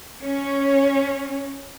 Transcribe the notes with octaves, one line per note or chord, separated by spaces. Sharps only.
C#4 C#5